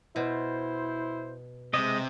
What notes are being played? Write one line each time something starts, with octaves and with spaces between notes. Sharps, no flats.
B2 E4 C5
C3 G#3 D#5